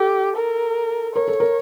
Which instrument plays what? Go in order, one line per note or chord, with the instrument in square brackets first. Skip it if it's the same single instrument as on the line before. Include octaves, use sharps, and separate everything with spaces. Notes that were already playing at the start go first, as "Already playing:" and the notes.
Already playing: [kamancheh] G4 [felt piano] A4
[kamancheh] A#4
[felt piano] A#4 [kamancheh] C#5
[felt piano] A4
A#4